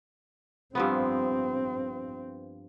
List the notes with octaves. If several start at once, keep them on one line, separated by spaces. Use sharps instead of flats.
G2 F3 B3 C4